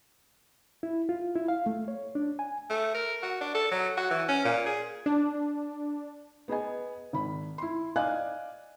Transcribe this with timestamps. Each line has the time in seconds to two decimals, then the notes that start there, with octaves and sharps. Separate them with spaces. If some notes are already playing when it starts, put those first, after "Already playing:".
0.83 E4
1.09 F4
1.36 E4
1.48 F5
1.66 A3
1.88 C#5
2.15 D4
2.39 G#5
2.70 A3
2.94 A#4
3.22 F#4
3.41 D4
3.54 A4
3.71 F#3
3.97 F#4
4.10 E3
4.28 C#4
4.45 A#2
4.66 G#4
5.06 D4
6.48 B3 G#4 D#5 G#5
7.13 G#1 B5
7.58 E4 C6
7.96 D5 D#5 F5 G#5 F#6